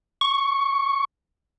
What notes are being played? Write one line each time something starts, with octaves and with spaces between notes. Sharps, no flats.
C#6